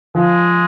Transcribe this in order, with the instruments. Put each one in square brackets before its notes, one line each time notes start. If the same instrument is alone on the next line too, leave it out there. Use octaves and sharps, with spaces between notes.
[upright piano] F3 [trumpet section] G#3